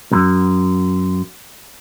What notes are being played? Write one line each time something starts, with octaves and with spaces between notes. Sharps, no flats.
C2 F#2